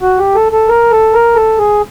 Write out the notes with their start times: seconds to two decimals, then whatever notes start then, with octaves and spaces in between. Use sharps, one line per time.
0.02 F#4
0.19 G4
0.35 A4
0.52 A4
0.68 A#4
0.92 A4
1.14 A#4
1.35 A4
1.59 G#4